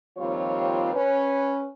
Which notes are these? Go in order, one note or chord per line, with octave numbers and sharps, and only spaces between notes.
D#2 F3 G3 C4 F4 C#5
C#4 B4